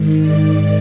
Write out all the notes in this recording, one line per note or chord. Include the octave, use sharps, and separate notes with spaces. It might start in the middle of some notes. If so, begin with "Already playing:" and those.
Already playing: G#2 D#3
D5